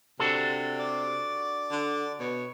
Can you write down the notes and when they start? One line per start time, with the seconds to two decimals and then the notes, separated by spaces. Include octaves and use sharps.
0.20 C3 D4 F#4 A4
0.79 D5 D6
1.71 D3
2.20 B2 C#5